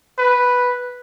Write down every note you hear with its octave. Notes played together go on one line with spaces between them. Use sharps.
B4